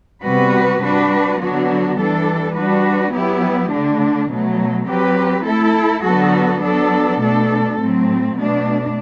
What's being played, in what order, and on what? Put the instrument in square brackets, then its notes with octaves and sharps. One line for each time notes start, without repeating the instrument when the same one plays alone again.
[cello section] C3 G3 B3 F#4 B4
G3 D4 F#4 B4
D3 F#3 B3 D4 F#4
E3 G3 D4 A4
G3 D4 F#4 B4
F#3 B3 E4 G4
D3 A3 D4
B2 F#3 A3
F#3 C4 G4 B4
A3 E4 A4
D3 F#3 B3 F#4 A4
F#3 B3 D4 A4
B2 A3 D4 A4
A2 F#3 A3 C4
B2 A3 D4